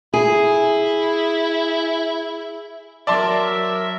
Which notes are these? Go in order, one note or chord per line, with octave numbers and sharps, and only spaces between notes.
E4 G#4
F#3 A#4 D5 E5 A5 C6